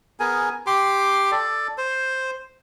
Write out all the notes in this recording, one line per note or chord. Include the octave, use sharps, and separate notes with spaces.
B3 G#4 A#4 G#5
G4 C6 D6
A4 D5
C5